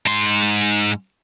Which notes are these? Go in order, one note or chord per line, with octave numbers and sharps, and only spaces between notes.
G#2 C6